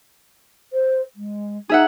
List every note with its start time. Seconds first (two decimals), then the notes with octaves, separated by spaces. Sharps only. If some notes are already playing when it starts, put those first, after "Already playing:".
0.73 C5
1.16 G#3
1.69 D#4 G#4 E5 F#5